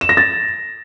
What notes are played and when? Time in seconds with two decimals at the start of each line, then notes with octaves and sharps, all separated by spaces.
0.01 E7
0.09 A#6
0.17 A6